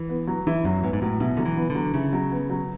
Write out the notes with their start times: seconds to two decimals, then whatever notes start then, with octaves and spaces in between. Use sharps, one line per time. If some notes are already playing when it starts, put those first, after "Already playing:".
Already playing: E3
0.09 B3
0.27 F#3
0.47 E3 E4
0.65 F#2 F#3
0.83 G#2 B3
0.93 G#2
1.02 A2 F#3
1.20 B2 E4
1.37 D3 F#3
1.45 E3
1.57 B3
1.70 D3 F#3
1.94 C#3 E4
2.13 F#3
2.31 B3
2.50 F#3